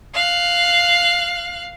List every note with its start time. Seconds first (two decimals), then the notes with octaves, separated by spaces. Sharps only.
0.14 F5 F#6